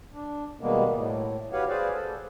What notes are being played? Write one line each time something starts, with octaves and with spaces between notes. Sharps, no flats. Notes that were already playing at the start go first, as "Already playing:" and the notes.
D4
B2 D#3 G3 G#3 A#3 B3
A2
F#4 G4 B4 C#5 F5 F#5
G#4 B4 C5 D5 F5
A4